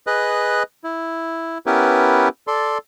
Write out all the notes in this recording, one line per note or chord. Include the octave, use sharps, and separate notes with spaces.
G#4 B4 D#5 F#6
E4
B3 C#4 E4 G4 A#4 B4
A4 D5 C6